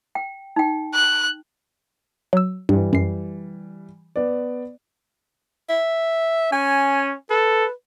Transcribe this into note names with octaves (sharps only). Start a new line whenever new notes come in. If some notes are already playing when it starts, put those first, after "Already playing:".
G5
D#4 G5
F#6
F#3 E6
G2 E3 G3
F#2 C7
B3 D5
E5
C#4 G#5
A4 B4